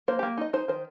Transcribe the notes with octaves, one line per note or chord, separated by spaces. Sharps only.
A#3 C5
G4
A#3
D#4 D#5
D#4 C5
D#3 C5